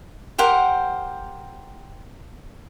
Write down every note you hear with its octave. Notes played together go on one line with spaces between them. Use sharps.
G4 A#4 C5 F#5